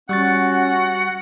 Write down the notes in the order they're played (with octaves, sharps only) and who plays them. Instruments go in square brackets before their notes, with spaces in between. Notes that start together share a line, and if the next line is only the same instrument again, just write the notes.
[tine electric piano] G3 C#6 A6 [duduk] C#4 [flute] F#4 [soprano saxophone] F#5